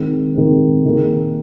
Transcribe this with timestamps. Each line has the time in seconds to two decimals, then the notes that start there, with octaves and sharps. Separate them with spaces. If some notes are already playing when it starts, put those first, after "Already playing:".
Already playing: D#3 G#3 C4
0.35 D#3 G#3 C4
0.85 D#3 A#3 G#4